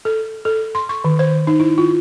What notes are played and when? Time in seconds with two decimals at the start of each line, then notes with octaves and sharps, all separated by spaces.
0.05 A4
0.45 A4
0.75 C6
0.89 C#6
1.05 D#3
1.19 C5
1.47 D#4
1.60 E4
1.78 F4